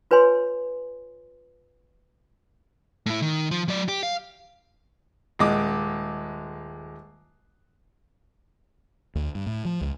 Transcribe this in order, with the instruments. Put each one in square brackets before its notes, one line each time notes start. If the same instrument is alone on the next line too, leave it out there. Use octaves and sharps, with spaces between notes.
[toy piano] F4 B4 C#5 G#5 C6
[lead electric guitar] A2 E4
D#3
F3
F#3 D5
G4
F5
[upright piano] D#1 G#3 D6
[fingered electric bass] D2
G2
A2
F3
C#2